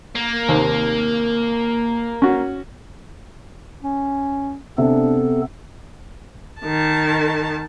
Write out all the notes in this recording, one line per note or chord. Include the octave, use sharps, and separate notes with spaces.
A#3
D#2 C3 D#3
C#4 F#4
C#4
C3 B3 D4 A4
D#3 A5